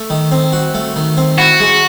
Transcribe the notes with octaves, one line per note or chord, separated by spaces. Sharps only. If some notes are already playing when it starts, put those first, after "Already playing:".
Already playing: A3
D#3
C4
F#4
A3
D#3
C4
E4 F#4
G#3